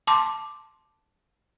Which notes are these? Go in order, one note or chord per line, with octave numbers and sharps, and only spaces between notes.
A5 C6 D6